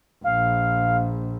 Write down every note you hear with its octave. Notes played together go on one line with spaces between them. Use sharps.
A#1 F5